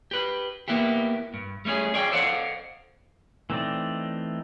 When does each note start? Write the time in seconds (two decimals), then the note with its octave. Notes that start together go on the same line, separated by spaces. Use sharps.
0.11 G4 B4
0.68 A#3 B3 E4 G4
1.34 G2
1.65 G3 A3 B3 C#4 G#4
1.94 G#4 C#5 D5 F5 G5
2.12 A4 C5 D5 F5 F#5
3.50 E3 A3 C4 D#4 D5